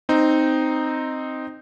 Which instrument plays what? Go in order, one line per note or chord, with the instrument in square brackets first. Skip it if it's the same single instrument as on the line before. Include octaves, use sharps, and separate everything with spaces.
[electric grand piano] C4 D#4